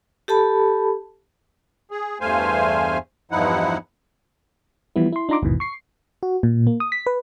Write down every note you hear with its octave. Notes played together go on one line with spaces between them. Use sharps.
G4 A4 A5 B5
G#4
E2 G2 A3 C5 F5 G#5
E2 G2 F3 D#4 E4 F#5
E3 F3 G3 B3 E4
E4 C6
D4 D#4 F4 A#5 C6 D6
A#1 E2 G#2 B2 D#3 E3
C#6 C7
F#4
A#2
A#3
D#6
B6
B4